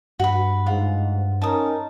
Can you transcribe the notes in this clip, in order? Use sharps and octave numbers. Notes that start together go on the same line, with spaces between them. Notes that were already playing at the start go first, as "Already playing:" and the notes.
G2 F#4 B4
G#2 F4 F#5
C#4 D#4 A#4 A5 D#6